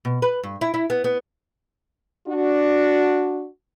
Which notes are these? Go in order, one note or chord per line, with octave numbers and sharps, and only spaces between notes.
B2
B4
G2
E4
E4
B3
B3
D4 F#4